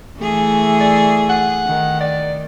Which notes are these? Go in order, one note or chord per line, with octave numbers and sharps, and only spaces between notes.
E3 A3 G#4
D5
F#5
D#3
D5